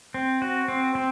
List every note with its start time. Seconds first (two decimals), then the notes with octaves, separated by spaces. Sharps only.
0.14 C4
0.42 F#4
0.68 C4
0.95 C4